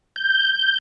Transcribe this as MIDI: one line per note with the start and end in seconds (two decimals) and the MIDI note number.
0.16 0.78 91